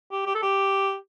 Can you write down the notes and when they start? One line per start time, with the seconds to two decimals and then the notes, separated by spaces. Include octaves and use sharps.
0.11 G4
0.26 G4
0.35 A4
0.42 G4